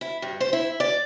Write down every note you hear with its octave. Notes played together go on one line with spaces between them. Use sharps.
E4
G2
C5
E4
D5